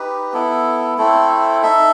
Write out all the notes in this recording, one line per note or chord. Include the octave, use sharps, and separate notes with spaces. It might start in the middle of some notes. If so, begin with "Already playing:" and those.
Already playing: D#4 G4 B4
B3 E4 A4
A3 C4 E4 A4
D#4 A4 E5